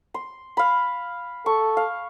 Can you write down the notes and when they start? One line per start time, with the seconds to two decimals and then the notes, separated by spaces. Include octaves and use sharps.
0.14 C6
0.57 F5 B5
1.46 A4 C#6
1.77 F5